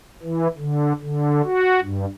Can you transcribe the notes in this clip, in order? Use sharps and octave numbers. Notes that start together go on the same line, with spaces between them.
E3
D3
D3
F#4
G2